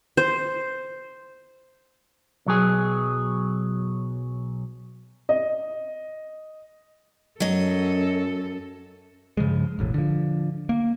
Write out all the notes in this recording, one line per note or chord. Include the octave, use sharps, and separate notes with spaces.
C5
B1 F#3 G#4
D#5
F#2 F#3 A4 D#5
G2 C#3 F3 G#3
E1 A1 A2
D3 F3
A#3